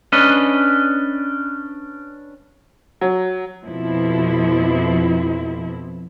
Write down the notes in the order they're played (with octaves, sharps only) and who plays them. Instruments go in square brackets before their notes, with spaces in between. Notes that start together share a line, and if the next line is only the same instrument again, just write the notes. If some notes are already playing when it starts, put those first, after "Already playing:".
[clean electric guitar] C#4 D4 B4 D#5
[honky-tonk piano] F#3
[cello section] F2 B2 F3 E4